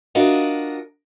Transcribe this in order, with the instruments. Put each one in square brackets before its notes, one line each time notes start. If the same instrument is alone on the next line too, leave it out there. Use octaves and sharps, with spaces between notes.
[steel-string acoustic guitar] D4 F4 F#4 A#4 D#5